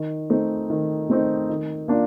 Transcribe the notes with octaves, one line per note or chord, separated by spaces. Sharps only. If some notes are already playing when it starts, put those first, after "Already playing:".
Already playing: D#3
A3 C4 D#4
D#3
A3 C4 D#4
D#3
A#3 D4 F4